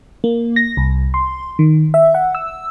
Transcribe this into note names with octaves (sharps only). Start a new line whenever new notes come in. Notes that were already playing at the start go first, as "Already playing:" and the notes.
A#3
A#6
C2
C6
D#3
E5
F#5
E6